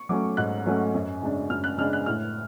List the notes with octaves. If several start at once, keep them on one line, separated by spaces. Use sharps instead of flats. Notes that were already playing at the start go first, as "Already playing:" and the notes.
Already playing: C#6
F#3 A3 C#4 D6
G#2 F#6
F#3 A3 C#4
F#2
C#3 G#3 D4
F#2 F6
F#6
C#3 G#3 D4 F6
F#6
A2 F6